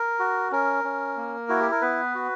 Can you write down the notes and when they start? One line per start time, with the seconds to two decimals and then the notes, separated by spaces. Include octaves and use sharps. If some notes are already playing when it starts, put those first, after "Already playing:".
Already playing: A#4
0.19 F#4
0.52 C#4 A#4
0.84 C#4
1.17 A#3
1.49 E4 F#4
1.60 G4
1.71 A#4
1.81 B3 B4
2.15 F#4